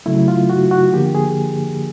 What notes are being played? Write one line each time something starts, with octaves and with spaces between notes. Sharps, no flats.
C#3 F#3 A3 E4
F4
F#4
F#4
D3 F3 A#3 G4
G#4